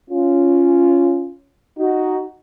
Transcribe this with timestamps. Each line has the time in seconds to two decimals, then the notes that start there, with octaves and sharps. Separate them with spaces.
0.10 C#4 F4
1.78 D#4 F#4